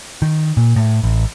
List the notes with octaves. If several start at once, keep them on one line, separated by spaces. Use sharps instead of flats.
D#3
A#2
A2
A1